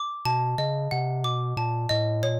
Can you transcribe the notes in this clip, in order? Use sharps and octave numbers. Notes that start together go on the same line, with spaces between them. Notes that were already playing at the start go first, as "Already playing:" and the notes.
Already playing: D6
B2 A5
C#3 D#5
C3 F#5
B2 D6
A#2 A5
A2 D#5
A#2 C#5